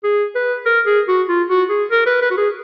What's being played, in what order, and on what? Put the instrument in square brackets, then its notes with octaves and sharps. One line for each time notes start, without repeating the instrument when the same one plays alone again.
[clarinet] G#4
B4
A#4
G#4
F#4
F4
F#4
G#4
A#4
B4
B4
F#4
G#4